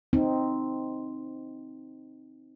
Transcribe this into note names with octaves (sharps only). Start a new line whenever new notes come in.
C4 D#4